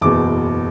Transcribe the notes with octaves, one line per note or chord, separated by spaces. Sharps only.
F#1 E2 B2 D6